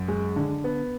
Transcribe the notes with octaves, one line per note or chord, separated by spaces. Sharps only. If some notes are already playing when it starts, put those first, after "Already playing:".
Already playing: F#2
G#3
D3
B3